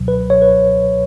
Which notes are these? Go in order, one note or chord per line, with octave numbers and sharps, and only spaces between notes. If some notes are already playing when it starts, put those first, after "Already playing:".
Already playing: C#2 B2 F#3
B4
C#5
B4